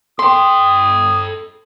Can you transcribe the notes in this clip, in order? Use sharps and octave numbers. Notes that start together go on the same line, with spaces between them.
A4 G5 C6 D#6